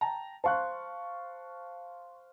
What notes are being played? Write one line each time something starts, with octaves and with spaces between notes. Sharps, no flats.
G5 A5 A#5
C5 F5 A5 C6 C#6 F#6